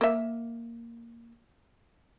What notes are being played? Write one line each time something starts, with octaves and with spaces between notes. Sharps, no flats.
A#3 E5